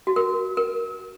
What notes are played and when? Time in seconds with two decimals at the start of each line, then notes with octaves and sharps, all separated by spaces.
0.07 F#4
0.16 A#4
0.57 A#4